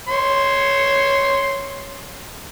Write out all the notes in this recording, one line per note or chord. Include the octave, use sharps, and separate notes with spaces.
C#5 C6